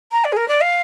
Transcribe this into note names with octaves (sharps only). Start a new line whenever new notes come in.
A#5
D5
G#4
A#4
D5
F5